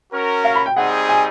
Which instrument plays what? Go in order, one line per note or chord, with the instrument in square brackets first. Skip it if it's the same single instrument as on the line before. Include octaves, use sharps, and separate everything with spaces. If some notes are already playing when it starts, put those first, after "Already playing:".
[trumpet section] C#4 F#4 A#4
[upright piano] F5
B5
G5
[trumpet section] G3 C4 D#4 G#4 [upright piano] F#5
[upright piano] G#5